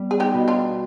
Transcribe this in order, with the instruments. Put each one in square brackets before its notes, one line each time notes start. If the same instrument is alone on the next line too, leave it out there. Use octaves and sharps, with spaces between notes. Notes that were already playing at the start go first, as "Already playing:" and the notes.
Already playing: [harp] G3 B3
[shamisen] G#4
D#4 G4
[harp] B2
[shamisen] D4 F4